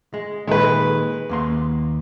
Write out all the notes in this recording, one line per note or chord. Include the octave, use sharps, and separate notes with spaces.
G#3
A#2 D#3 G#3 B4
D#2 A#3 C6